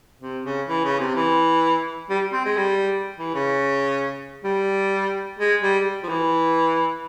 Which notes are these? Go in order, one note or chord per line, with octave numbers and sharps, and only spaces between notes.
C3
C#3
E3
C#3
C3
E3
G3
C4
G#3
G3
E3
C#3
G3
G#3
G3
F3
E3